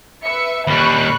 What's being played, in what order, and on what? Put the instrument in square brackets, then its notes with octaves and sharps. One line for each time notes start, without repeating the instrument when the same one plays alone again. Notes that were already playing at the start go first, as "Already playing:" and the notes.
[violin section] B4 E5 C#7
[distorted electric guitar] D#2 G3 [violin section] B5 C#6 F#6